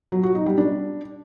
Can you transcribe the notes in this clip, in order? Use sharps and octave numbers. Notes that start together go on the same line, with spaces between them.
F#3
F#4
D#4
G3
D4